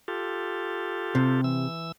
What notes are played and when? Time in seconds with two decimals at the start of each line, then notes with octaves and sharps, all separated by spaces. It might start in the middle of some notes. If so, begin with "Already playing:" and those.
0.08 F4 G4 A4
1.15 C3
1.44 E3 E6